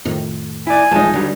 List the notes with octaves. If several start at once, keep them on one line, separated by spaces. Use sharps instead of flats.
F2 A2 D#3
E4 D5 G#5
D#1 F3 G#3 D#4 A5
G2 D3 F#3 G3